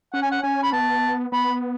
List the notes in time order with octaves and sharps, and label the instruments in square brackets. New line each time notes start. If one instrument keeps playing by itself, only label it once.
[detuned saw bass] C#4 [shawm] F#5
[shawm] G#5
F#5
[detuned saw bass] C#4 [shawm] G#5
[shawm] B5
[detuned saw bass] B3 [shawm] A5
[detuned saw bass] B3 [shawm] B5